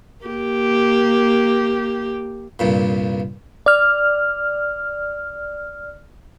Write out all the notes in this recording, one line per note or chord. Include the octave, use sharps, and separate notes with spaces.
A#3 G4
C2 G2 A#2
D5 F6